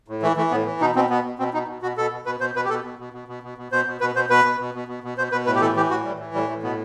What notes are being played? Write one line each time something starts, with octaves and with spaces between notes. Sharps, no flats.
A2
E3 A3
E3 A3
A2 B3
E3
B2 D#4
B2 C4
B2 B3
B2
B2 C4
B2 D#4
B2
B2 F#4
B2 A4
B2
B2 B4
B2 C5
B2 B4
G4
B2 A4
B2
B2
B2
B2
B2
B2
B2 C5
B2
B2 B4
B2 C5
B2 B4
B2
B2
B2
B2
B2
B2 C5
B2 B4
A2 B4
G4
E3 A4
E3 G4
A2 F#4
A2 G3
E3
A2 G3
A2 A3
B2 B3